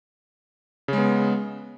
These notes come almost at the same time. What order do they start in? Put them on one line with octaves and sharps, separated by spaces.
C#3 G#3 B3